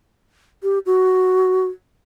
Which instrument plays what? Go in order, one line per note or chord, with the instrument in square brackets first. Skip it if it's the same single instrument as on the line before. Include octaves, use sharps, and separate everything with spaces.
[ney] G4
F#4